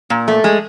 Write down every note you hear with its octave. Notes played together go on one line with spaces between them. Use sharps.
A#2
A3
G#3